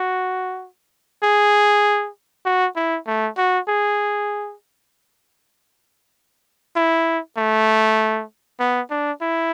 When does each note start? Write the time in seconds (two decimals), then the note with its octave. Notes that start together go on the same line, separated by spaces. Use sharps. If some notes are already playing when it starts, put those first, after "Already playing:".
Already playing: F#4
1.23 G#4
2.46 F#4
2.76 E4
3.07 A3
3.38 F#4
3.68 G#4
6.76 E4
7.37 A3
8.60 B3
8.90 D4
9.21 E4